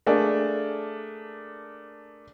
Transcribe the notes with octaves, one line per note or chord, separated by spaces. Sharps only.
A3 A#3 D4 G#4